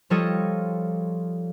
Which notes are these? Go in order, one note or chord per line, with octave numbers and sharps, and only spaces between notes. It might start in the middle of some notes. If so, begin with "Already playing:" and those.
F3 G3 F4 A4 C#5 D#5